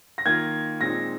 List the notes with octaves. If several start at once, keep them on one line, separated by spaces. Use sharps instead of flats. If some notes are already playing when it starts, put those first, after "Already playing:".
A#6
D#3 A#3 F4 G#6
A#2 G#3 C4 D#4 A#6